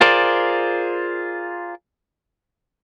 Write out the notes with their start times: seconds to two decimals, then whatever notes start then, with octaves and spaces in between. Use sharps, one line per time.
0.01 F4 G#4 A#4 C5 D5